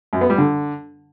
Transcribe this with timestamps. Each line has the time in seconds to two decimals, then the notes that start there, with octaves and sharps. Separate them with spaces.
0.13 F#2
0.21 B3
0.30 G3
0.38 D3